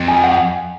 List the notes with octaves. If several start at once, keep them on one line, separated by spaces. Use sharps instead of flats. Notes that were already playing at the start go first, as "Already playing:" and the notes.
Already playing: F2
G#5
F#5